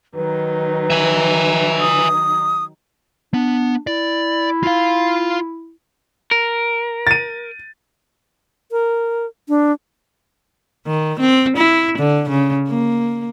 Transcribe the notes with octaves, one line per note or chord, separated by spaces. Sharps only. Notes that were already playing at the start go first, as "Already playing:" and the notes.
D#3 F#3 D#4 B4
E5 G#5
D#6
B3 D4
E4 D5
F4 F5
A#4
A6 D#7
A#4
D4
D#3
C4
E4
D3
C#3
A#3